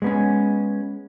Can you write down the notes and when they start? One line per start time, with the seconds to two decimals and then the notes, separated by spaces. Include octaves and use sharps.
0.02 G#3 B3 C#4